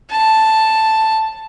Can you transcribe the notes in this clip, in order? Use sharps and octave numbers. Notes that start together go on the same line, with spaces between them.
A5